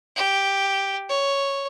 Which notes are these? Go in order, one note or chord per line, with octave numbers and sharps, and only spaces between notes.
G4
C#5